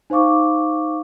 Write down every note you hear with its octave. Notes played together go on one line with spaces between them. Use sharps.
D#4 C5 F5 C#6 D6